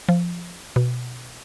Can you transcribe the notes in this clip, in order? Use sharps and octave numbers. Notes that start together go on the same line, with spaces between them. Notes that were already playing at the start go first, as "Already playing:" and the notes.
F3
B2